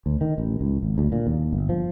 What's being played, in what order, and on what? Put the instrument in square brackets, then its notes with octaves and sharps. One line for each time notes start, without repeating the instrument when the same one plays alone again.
[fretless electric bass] D2
D#3
A1
C#2
G#1
D2
A#2
D#2
G1
F3